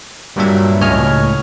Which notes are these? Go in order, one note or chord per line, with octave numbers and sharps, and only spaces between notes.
G2 A#2 F#3 G3 D4 E5
C#2 A2 C#5 D#5 G#5 F6